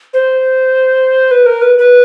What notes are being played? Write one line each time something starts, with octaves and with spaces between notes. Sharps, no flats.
C5
B4
A#4
B4
B4